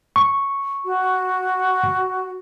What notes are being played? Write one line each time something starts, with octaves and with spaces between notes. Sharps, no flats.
C#6
F#4